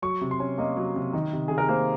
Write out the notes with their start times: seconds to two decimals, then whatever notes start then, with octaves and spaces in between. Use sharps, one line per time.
0.02 F#3 C#6
0.21 C3
0.31 C6
0.40 C#4
0.58 A#3 D#5
0.77 F#3
0.96 C3
1.13 D#3
1.33 C3
1.48 C3 G#4
1.58 A#4
1.69 A#3 C5